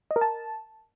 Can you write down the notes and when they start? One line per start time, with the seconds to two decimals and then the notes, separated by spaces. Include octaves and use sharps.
0.11 D#5
0.16 A#4
0.21 A5